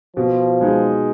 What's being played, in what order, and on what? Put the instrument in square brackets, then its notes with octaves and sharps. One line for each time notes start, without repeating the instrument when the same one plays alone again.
[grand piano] B2 [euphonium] F3
[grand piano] G#3 D#4 G#4